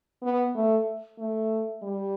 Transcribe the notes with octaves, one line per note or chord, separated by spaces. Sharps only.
B3
A3
A3
G3